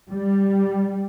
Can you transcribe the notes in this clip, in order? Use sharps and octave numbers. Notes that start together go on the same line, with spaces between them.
G3